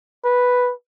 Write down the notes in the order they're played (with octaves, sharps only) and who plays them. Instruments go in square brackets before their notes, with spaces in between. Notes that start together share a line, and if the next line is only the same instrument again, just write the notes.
[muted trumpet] B4